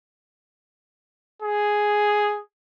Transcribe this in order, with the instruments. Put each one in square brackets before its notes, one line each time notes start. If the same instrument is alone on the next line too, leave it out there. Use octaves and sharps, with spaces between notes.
[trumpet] G#4